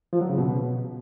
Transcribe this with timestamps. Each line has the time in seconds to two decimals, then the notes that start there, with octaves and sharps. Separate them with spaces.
0.13 F3
0.21 F#3
0.30 C#3
0.38 B2